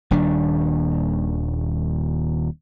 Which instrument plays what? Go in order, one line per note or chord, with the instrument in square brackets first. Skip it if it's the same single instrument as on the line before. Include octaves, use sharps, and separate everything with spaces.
[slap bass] D#1 D#2 G3 D4